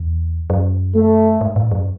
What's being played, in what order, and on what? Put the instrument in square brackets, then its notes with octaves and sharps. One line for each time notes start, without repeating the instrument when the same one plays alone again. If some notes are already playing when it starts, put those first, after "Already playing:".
Already playing: [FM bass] E2
F#2
[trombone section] A3
[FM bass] G#2
A2
F#2